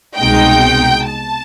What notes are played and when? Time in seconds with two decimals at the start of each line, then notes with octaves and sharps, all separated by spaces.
0.17 C2 B2 G#3 C4 D#4 G5
1.10 A5